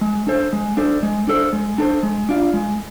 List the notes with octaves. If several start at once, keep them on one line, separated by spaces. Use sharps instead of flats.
G#3
D4 A4 C5
G#3
D4 A4 C5
G#3
D4 A4 C5
G#3
D4 A4 C5
G#3
D4 F4
G#3